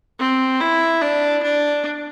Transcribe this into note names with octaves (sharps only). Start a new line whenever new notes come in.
C4
E4
D4
D4